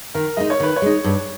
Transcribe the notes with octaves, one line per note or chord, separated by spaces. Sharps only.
D#3 A#4
G#3 D#4 D#5
C#5
D#3 B4
C#5
G#3 D#4
G2